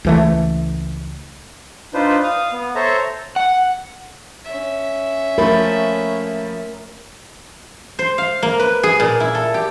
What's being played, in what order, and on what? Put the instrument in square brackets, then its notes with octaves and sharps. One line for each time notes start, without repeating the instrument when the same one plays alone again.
[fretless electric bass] C#2 E3 A3
[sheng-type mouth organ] D4 D#4 F4 B4 C5
F5 D#6
B3
A4 C5 C#5 E5 A#5
[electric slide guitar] F#5
[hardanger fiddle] C#4 E5
[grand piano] F3 A3 B5 [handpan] A#4
[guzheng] C5
F5
A#3
B4
G#4
A#2
E4
A4
G4